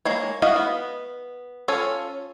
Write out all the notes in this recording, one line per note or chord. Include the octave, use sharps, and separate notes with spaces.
G#3 A#3 C#5
E4 F#4 D#5 F5
B3
C#4 F4 A4 C#5